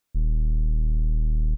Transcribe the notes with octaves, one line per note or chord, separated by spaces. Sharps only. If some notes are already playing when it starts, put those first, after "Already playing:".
D#1